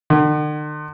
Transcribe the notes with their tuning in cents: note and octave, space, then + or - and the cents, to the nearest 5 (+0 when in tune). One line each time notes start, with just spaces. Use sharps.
D3 +45